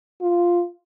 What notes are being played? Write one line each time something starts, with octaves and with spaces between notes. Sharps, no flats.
F4